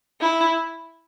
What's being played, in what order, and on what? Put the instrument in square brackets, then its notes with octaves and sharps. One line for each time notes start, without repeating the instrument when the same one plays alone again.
[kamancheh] E4